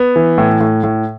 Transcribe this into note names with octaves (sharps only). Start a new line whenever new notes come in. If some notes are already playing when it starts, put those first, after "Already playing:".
Already playing: B3
E3
A2
A2
A2